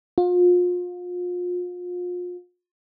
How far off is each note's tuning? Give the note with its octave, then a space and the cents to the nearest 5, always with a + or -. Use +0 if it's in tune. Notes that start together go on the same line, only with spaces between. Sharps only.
F4 +35